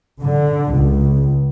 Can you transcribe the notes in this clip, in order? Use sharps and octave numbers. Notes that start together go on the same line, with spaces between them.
D3
C#2